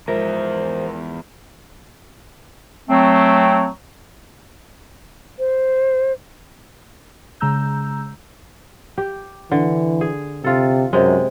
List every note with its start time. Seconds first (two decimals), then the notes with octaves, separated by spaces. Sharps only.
0.08 E2 G#2 F3 A#4 C5 E5
2.89 F#3 A3 C4
5.39 C5
7.40 C#3 G#3 A#5 E6 G6
8.98 G4
9.52 D3 E3
10.01 G#4
10.44 C3 F4 A4
10.93 F#2 C3 G#3